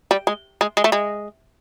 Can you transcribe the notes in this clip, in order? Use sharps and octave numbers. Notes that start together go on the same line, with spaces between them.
G3
G#3
G#3
G#3
A3
G#3